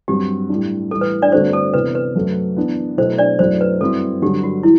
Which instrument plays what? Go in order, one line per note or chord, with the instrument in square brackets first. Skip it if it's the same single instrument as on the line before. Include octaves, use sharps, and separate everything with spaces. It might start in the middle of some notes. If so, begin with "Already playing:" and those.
[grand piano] G2 F#3 C4 [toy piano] G4
[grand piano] A2 G3 D4
[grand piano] A2 E3 G3 [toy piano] A4
[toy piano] B4
D4 D5
[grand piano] G2 D3 A3 C4 F#4 [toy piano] C5
[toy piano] A4
[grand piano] C3 E3 B3 [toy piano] B4
[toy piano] B4
[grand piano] F#2 F#3 A3
E3 B3 D4
[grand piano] B2 F#3 A3 E4 [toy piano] C5
[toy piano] D4 D5
[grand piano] F#2 F#3 A3 E4 [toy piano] C5
[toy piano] B4
[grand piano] G2 F#3 C4 E4 [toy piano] A4
[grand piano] G2 D3 F#3 [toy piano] G4
[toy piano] F#4
[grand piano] E3 [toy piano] E4